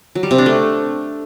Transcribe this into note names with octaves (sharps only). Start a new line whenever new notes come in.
F#3
G3
C3
D4
A3